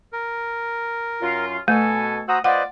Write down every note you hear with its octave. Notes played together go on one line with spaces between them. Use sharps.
A#4
F#2 F4
B2 A3 A4 G#5
F#4 C5 F#5 A#5 D#6 E6
F4 B4 C5 D5 D#5 F#5